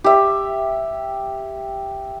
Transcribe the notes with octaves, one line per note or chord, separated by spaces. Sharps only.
G4 E5